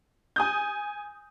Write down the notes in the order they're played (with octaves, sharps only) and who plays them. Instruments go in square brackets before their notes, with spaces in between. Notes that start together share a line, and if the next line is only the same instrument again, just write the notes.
[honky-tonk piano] G#5 D#6 G6